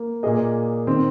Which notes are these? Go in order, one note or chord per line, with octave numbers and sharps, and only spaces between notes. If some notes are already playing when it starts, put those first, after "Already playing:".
Already playing: A#3
A#2 A#3 G#4 D#5
D#3 C4